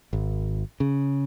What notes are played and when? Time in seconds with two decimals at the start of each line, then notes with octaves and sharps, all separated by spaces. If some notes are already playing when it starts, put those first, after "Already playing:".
0.13 G#1
0.80 C#3